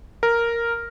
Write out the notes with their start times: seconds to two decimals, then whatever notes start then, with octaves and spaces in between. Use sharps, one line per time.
0.23 A#4